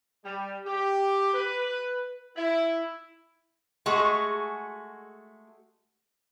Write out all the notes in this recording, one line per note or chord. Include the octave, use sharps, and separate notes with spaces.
G3
G4
B4
E4
G#3 A3 F#4 G#4